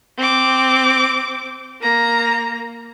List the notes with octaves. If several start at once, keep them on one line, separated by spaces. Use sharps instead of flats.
C4 D6
A#3 A#5